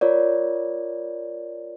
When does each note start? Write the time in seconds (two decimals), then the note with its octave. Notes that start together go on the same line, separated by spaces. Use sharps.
0.01 F4 A#4 C#5 D5